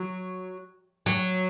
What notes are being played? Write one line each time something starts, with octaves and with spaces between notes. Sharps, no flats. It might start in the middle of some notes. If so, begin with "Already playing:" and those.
Already playing: F#3
F#3